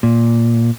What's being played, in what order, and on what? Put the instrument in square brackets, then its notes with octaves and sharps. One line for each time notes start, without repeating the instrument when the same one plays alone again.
[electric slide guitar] A#2